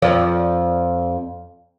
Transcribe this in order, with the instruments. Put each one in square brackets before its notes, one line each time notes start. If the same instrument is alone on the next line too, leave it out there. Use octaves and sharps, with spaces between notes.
[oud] F2 F3 D5